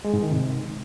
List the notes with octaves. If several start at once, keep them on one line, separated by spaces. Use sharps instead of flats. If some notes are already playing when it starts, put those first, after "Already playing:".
G#3
G#2
D#3
C3